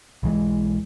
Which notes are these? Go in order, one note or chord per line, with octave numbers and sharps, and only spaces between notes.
B1 E3 G#3